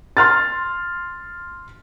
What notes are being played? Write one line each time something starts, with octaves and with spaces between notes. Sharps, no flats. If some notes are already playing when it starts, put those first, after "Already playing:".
C6 F6 A6